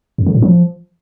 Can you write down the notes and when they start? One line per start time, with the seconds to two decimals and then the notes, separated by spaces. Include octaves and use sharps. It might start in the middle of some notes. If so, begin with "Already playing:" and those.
0.18 F2
0.26 C#3
0.34 A2
0.42 F3